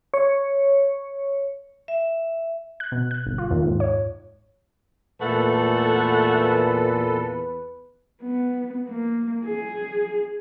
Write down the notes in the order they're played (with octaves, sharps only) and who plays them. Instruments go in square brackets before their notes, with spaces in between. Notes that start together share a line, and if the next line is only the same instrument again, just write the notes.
[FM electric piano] C#5
[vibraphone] E5
[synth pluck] F#6
B2
F#6
G1
F4
D#2
G#2
C#5
[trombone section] E2 B4 [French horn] A#2 [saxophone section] A3 E5 F#5 [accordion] A4
[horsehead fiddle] B3
A#3
G#4